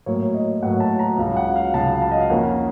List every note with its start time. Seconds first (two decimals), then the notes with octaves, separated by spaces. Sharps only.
0.06 A2 F#3 A#3 C#5
0.34 D#5
0.63 A2 F#3 A#3 F#5
0.80 A5
0.99 A#5
1.18 C#2 C#3 F#3
1.37 F#5
1.56 F5
1.74 C#2 C#3 F#3 A5
2.02 A5
2.12 D#5
2.20 F5
2.29 F2 D#3 A#3 C#4 F#5